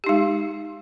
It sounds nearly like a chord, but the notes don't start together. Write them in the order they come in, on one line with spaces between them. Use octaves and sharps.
G4 D#4 G#3